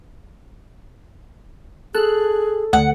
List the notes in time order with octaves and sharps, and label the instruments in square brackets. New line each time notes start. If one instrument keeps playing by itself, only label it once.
[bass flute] G#4 [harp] A4 [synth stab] F#6
[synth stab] D2 [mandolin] F#5